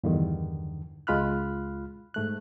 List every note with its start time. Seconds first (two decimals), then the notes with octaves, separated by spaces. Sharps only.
0.04 E2 G2 D3 D#3
1.07 C#2 G#3 F4 B5 F6 F#6
2.14 G#2 A3 F#6